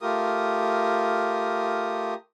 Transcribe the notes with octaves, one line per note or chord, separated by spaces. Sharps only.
A3 F4 G4 A#4 D#6